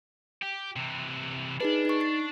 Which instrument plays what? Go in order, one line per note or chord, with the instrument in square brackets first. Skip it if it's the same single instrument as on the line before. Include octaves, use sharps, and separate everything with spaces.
[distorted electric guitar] G4
C3 E3
[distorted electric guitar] D4 [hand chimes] D#4 G#4 B4
[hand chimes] D#4 C#6
A6 C7